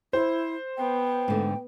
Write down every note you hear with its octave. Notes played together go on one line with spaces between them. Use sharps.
E4 C5
B3 G5
G#2 D3 A3